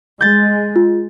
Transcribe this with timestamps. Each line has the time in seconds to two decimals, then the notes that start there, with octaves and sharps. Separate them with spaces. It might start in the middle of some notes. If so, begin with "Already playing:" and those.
0.21 G#3 G6 A6
0.76 F4